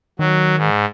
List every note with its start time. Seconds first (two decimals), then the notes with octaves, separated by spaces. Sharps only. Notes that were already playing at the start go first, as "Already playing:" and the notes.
0.19 D#3 F#3
0.57 G#2